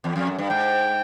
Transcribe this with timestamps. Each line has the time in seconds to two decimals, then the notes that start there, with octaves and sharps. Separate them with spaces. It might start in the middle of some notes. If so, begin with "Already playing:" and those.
0.04 E2
0.16 F2
0.27 F#2
0.38 G2
0.50 G#2 G5